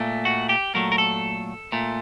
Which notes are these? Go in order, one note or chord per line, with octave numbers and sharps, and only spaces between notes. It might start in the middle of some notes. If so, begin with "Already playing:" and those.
Already playing: A#2 A3
F#4
G4
A#2 F#3 A3 A#4
A#4
A4
A#2 A3